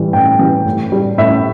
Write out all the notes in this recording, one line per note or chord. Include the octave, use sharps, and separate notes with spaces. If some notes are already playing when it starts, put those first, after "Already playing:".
Already playing: A2 E3 G3
A2 G5
E3 G3
A2
G3
A2 E5